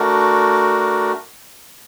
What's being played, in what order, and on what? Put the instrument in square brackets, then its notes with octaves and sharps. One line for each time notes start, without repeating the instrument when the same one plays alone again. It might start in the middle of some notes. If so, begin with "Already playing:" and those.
Already playing: [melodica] A3 D4 F#4 A#4